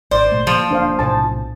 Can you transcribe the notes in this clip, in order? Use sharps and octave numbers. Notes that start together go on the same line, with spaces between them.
G#1 C5 D5 D6
G#1 A#2 A3
E3 F3 A#3
E1 A#3 C#4 D4 C5 F5
B1 A2 C3 C5 G#5 A5